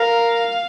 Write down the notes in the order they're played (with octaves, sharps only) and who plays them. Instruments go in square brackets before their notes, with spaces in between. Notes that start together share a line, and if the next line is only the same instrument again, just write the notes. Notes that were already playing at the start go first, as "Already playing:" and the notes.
Already playing: [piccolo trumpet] A#4 [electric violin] F5